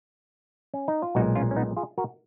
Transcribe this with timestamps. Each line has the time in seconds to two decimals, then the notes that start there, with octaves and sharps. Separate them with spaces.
0.74 C#4
0.88 D#4
1.02 F4
1.15 B1 A#2 G#3 D#4 F#4
1.35 C#4 F4
1.51 C#4
1.56 B3 D#4
1.77 F4 G#4
1.98 F#4 A#4